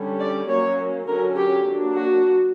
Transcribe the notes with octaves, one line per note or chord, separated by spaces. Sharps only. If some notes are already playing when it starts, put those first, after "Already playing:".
Already playing: D3 G3 C#4
D5
F#3 A#3 C#4 C#5
D3 F#3 C#4 A#4
G4
F#3 A#3 D4
F#4